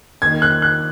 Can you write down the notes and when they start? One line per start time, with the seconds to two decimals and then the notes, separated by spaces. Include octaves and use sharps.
0.22 D#2 D#3 G#6
0.42 F#6
0.62 F#6